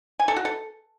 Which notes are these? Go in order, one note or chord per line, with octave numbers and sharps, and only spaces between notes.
G#5
A4
F#4
A4